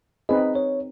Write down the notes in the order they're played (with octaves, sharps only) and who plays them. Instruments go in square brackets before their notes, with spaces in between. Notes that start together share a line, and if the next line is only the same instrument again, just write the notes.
[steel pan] C4 D#4 G#4 B4 [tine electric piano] D#5
[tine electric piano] C#5